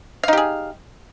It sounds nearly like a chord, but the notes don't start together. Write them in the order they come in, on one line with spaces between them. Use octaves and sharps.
F5 D#4 G4 G#4